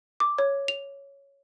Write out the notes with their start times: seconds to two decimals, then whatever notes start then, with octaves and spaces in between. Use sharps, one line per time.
0.20 D6
0.38 C#5
0.68 F7